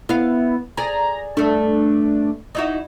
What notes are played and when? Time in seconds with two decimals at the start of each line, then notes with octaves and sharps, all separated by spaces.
0.09 B3 E4 F5
0.77 G#4 D5 A#5
1.37 G2 A3 D4
2.55 D#4 E4 F#4